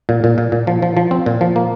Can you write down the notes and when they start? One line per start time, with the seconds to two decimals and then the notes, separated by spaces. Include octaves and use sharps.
0.09 A#2
0.24 A#2
0.38 A#2
0.52 A#2
0.67 F3
0.82 F3
0.97 F3
1.11 C4
1.26 A#2
1.41 F3
1.56 A#3